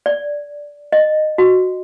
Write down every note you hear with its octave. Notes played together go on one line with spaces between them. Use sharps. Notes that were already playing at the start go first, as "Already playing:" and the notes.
D5
D#5
F#4